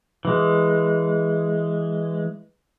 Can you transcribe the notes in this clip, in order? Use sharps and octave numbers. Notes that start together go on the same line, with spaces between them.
E3 G#3